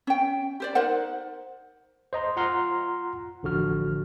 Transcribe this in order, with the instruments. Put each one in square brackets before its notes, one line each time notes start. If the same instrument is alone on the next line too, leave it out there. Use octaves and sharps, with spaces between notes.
[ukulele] C#4 G5
G4 C5 D5
D#4 A#4 C5 F#5
[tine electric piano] C5 D#5 A#5 C6
F4 F#5 A#5 C6 F6
A1 D3 F3 F#4 F6